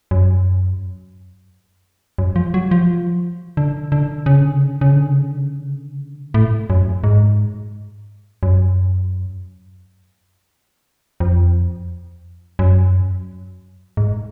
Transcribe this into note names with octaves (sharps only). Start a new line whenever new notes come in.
F#2
F#2
F3
F#3
F3
D3
D3
C#3
D3
C#3
D3
C#3
D3
C#3
D3
C#3
D3
C#3
D3
C#3
D3
C#3
A2
F#2
G#2
F#2
F2
F#2
G#2